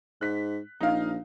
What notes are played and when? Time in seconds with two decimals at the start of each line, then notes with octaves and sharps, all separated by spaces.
0.21 G#2 F#6 B6
0.81 A#1 D#4 F5